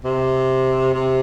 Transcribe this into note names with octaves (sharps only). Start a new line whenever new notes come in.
C3
C3